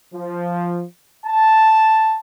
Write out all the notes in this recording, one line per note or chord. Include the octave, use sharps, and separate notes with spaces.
F3
A5